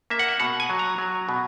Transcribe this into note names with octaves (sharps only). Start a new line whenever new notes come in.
A#3 E5
F#5
E5
B2 F#5
G#5
F#3
A#5
F#3
B2